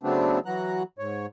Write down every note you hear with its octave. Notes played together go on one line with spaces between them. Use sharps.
C#3 F#3 A3 B3 C4 D4
E3 F#3 F#4 A#5 F#6
G#2 C#5